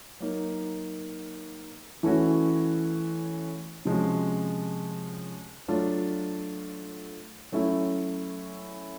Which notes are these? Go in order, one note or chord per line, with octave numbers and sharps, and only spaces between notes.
F#3 A#3 D#4
E3 A3 C#4 F#4
C3 F3 G#3 C#4 F#4
F#3 A3 D4 F4
F#3 A3 C#4 E4